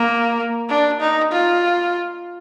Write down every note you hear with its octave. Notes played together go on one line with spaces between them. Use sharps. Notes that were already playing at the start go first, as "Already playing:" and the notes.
Already playing: A#3
D4
D#4
F4